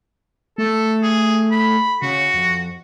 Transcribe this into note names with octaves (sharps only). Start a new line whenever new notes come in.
A3 A4
G#4
B5
C#3 F#4
F2